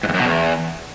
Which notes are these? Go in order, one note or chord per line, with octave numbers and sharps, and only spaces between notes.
G#2
E2
F#2
B2
E2